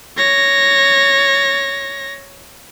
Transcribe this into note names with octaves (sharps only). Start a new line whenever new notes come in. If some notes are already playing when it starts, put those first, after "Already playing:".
C#5 A#6